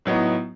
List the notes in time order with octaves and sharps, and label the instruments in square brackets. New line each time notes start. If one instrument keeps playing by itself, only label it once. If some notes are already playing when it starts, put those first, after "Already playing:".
[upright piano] A2 F#3 B3 D#4